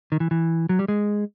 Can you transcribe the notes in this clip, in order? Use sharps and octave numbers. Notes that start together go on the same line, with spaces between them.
D#3
E3
E3
F#3
G3
G#3